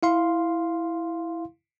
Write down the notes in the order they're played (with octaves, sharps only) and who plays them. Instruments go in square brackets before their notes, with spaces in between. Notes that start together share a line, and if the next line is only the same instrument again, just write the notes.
[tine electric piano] E4 F5 C6